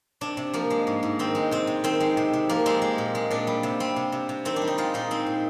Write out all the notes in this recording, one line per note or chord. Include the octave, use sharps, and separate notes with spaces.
C3 D4
C3
F3 A#3
G#3
G#2
G#2
D#3 C4
G#3
C3 C4
C3
D#3 C4
G#3
C3
C3
F3 A#3
G#3 C4
G#3
A#2
G#3
A#2 D4
G3
C3
G3 C4
C3
C3
C3
D#3 C4
D4
G3
D#4
G#3 F4
A#2 D#4
G#3 C4
A#2